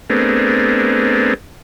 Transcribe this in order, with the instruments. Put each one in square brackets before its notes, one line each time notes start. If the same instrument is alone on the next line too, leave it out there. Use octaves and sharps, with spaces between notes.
[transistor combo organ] A3 B3 C4 D4 G#4 A#4